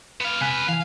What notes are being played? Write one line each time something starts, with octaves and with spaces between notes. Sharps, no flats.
B3 F5
C3 B4 F5 G#5 F#6
E3 F5 G#5